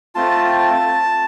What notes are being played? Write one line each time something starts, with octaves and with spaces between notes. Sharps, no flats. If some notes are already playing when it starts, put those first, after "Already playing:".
A3 C4 F4 A5